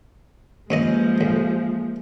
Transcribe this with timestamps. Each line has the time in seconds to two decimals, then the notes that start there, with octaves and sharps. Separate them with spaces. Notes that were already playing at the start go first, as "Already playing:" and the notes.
0.70 G2 F3 G#3 A#3 C#4 D#5
1.21 A1